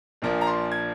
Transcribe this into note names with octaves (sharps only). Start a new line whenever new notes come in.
A#1 A#2 F3 A#3 D4
A#5
C6
G#6